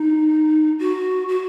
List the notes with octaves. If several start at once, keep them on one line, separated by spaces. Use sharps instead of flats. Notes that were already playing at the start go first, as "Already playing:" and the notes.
Already playing: D#4
F#4
F#4